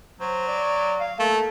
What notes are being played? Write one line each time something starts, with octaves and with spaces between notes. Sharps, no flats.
F#3 C5
D5
F5
A3 A#3